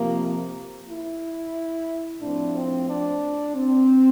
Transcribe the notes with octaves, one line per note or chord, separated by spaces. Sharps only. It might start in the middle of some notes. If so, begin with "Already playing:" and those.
Already playing: C3 F3 A#3
E4
A2 F3 C4 D4
C4
D4
C4